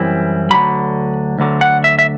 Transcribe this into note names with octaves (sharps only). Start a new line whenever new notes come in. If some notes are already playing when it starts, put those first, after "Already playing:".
Already playing: F#2 E3 G3 C4 E4
D2 D3 F#3 B5
D2 D3 F#3
F#5
E5
E5